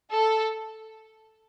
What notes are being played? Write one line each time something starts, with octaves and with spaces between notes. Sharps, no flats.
A4